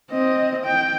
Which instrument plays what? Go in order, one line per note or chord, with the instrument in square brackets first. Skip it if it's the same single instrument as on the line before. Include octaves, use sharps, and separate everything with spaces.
[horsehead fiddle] C4 D#5
G5